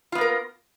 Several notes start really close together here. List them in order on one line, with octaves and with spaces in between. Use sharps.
F4 B3 A#3 A#4